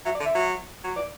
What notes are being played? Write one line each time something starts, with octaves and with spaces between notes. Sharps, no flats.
F#3 E5
D5
D3
E5
F#3
F#3
E3 D5